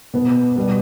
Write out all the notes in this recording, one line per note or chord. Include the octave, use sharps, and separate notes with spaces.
B2 B3
B2 G3 B3